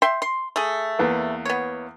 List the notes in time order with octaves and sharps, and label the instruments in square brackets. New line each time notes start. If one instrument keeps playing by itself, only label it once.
[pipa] E5 G5 C6
C6
A3 G#4
[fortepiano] E2 E3 A#3
[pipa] B3 C#5